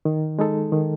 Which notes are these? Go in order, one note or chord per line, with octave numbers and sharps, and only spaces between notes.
D#3
G#3 D#4 A4
D#3